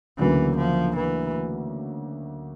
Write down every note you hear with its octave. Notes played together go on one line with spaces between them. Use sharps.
D2 C#3 E3 F#3 A#3
F3
E3